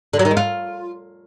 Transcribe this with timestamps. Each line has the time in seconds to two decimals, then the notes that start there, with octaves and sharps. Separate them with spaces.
0.14 D3
0.19 F#3
0.25 D#3
0.31 G#3
0.37 F4